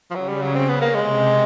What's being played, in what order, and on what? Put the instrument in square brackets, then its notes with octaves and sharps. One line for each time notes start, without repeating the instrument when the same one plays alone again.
[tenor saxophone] F3
[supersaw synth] C#3 [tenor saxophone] F#3
[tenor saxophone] G3
F#3
[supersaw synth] C#3 [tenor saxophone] C4
[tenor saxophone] B3
A#3
[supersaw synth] C3 [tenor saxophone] G#3